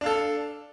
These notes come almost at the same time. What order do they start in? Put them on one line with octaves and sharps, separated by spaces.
D4 F5 A4